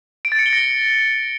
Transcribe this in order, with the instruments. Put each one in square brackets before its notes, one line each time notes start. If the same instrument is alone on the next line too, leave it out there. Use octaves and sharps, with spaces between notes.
[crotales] D7
A6
C#7
G7
A#6